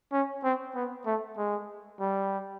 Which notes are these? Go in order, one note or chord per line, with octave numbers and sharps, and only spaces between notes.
C#4
C4
B3
A3
G#3
G3